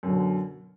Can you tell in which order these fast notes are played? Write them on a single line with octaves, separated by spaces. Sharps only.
F#2 D3 B2